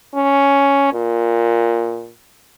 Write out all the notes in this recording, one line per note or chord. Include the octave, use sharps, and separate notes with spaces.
C#4
A#2